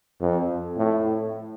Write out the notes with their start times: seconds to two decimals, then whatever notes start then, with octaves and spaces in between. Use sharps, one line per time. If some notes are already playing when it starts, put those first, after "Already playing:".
0.21 F2
0.77 A2